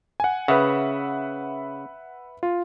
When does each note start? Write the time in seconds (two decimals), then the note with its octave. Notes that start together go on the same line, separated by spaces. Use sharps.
0.20 F#5 G#5
0.48 C#3 B4 E5 F#5
2.43 F4